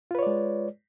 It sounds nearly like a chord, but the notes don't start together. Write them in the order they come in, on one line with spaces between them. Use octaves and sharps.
F4 B4 C#5 D5 G#3